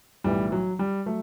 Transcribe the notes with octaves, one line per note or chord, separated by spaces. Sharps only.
B1 A2 E3 G3
F#3
G3
F#3 A3